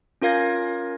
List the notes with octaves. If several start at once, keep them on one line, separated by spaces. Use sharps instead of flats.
C#4 F4 A#4 F5 G#6 A#6